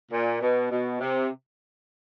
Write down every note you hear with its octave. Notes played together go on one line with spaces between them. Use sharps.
A#2
B2
B2
C3